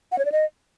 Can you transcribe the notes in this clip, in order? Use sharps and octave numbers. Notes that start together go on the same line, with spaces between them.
F#5
C#5
D5
D#5